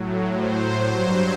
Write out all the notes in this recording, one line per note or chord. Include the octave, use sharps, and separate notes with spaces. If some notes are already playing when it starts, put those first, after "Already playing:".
Already playing: A2 F#3
C5
G2 F#3